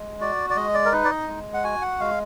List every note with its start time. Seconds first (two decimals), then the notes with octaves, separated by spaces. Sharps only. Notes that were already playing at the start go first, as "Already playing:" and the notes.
Already playing: G#3
0.21 F#4 D5
0.50 D5
0.56 G#3 D#5
0.74 D5
0.85 A#4
0.92 D#4 B4
1.05 D5
1.11 D#5
1.28 G#3
1.54 F#5
1.64 F#4 G#5
1.82 F#5
2.00 G#3 F5